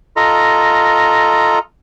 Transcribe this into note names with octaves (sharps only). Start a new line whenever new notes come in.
F4 A4 D#5 A#5